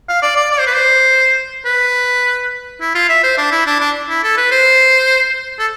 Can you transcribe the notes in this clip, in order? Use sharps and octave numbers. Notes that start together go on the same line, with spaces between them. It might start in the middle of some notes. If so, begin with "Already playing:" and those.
F5
D5
D5
D5
C5
B4
C5
B4
E4
F4
E5
C5
D4
E4
D4
D4
E4
A4
B4
C5
A4